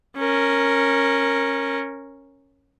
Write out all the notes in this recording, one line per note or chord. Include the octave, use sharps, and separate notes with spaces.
C#4 A#4